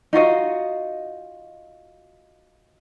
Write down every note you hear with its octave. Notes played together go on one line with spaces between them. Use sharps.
D#4 F4 F#4 D#5